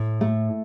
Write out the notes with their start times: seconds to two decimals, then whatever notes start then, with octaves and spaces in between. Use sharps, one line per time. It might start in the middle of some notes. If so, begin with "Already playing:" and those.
Already playing: A2
0.21 A3